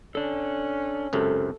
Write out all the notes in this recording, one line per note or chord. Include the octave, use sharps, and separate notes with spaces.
C#4 D4 A4
C#2 F#2 C3 A4